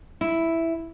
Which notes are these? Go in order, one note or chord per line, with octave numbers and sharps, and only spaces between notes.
E4